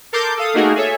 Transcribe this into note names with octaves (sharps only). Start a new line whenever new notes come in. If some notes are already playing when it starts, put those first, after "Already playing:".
A4 A#4 C6 D6 G6
A4 F5 D#6
A3 A#3 D#4 F#4 G#4 A#4
G#4 A4 C#5 E5